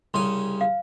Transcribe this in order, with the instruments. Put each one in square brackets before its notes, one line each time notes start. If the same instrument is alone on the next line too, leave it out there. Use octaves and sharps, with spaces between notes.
[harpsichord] C2 C#3 G#5 [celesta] C6
[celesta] F5